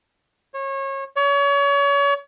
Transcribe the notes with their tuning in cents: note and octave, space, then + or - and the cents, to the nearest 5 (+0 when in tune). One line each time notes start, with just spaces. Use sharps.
C#5 -30
C#5 +35